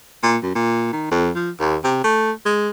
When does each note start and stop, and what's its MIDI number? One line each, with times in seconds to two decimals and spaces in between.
0.23 0.37 46
0.43 0.54 42
0.55 0.92 46
0.93 1.10 51
1.11 1.31 41
1.35 1.51 53
1.60 1.77 39
1.84 2.03 48
2.04 2.31 57
2.45 2.70 56